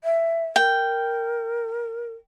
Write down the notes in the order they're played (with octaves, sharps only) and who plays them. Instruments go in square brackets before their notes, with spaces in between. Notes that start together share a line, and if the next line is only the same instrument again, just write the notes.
[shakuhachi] E5
[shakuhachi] A#4 [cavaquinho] G5